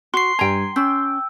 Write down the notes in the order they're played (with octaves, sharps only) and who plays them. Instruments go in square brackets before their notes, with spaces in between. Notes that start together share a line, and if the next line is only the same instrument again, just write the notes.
[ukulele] F#4 [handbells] C6 C7
[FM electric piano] G2 G#5 [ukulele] G5 A#5
[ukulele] C#4 [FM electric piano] G5 [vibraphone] E6